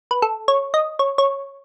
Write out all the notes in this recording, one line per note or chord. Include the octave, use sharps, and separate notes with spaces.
B4
A4
C#5
D#5
C#5
C#5